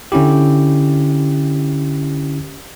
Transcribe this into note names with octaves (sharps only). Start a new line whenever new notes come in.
D3 C#4 E4 G4